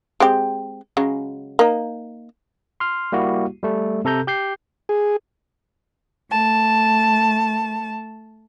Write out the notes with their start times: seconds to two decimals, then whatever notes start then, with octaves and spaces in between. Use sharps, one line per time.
0.20 G#3 C4 G4
0.97 C#3 F#3 G#3
1.59 A#3 D#4
2.80 C6 F6
3.12 G3 A#3 E4 F#4 G4
3.63 G3 A3
4.05 C3 A4 A#5 G6
4.27 G4 G6 C7
4.89 G#4
6.31 A3 A5